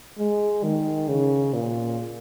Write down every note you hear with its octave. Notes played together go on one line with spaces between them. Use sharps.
G#3
D#3
C#3
A#2